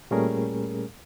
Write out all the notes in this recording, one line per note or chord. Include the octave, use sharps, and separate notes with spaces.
A#2 G3 A3 C#4 G#4 A#4